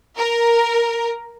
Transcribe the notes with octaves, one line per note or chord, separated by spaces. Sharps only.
A#4